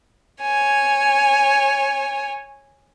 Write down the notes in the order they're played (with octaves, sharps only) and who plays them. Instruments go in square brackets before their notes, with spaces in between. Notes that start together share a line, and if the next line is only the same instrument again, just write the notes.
[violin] C#5 G#5